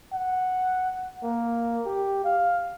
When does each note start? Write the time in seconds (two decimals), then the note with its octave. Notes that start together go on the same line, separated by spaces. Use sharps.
0.12 F#5
1.23 A#3
1.85 G4
2.24 F5